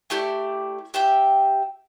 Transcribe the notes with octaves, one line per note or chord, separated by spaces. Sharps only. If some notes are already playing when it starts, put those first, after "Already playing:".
A3 E4 G4 D5
G4 E5 G5